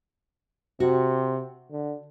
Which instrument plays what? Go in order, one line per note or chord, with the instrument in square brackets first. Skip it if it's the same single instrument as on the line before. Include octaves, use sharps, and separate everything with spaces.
[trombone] C3 [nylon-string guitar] F#4
[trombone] D3